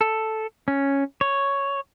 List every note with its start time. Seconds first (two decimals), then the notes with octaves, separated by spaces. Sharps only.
0.01 A4
0.68 C#4
1.21 C#5